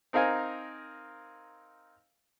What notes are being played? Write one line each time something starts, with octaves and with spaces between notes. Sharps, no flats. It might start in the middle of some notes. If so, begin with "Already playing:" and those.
C4 D#4 A#4 F5 G#5